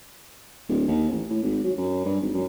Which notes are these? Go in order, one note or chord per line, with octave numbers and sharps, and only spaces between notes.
D1
D#2
A1
A2
G#1
F#3
F#2
G2
G#1
F#2